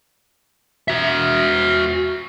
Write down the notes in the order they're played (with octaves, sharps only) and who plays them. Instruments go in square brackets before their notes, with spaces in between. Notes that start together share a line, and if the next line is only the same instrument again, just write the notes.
[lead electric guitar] F#4 E5